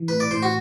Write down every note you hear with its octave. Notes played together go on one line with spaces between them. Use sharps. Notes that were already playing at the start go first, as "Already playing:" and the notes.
Already playing: E3
A2 B4
D5
A2 C5
F#4